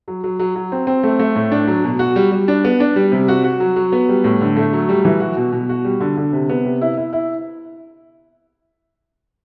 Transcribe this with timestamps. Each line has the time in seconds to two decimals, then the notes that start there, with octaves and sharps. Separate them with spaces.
0.08 F#3
0.24 F#3
0.39 F#3
0.56 F#3
0.72 C4
0.87 C4
1.03 A3
1.19 A3
1.36 A2
1.51 D4
1.67 F#3
1.84 B2
1.99 F#4
2.16 G3
2.32 G3
2.48 D4
2.64 B3
2.80 D4
2.96 G3
3.12 C3
3.28 F#4
3.44 F#4
3.60 F#3
3.76 F#3
3.92 B3
4.09 G3
4.24 A2
4.41 D3
4.56 A3
4.73 F#3
4.89 G3
5.05 E3
5.20 F#4
5.37 B2
5.52 B2
5.69 F#4
5.85 G3
6.00 D3
6.17 D3
6.33 C3
6.49 B3
6.65 C3
6.81 E4
6.97 E4
7.13 E4